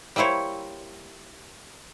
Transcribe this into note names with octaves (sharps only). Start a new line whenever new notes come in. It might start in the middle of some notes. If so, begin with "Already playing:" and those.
G3 A#3 E4 C5 C#5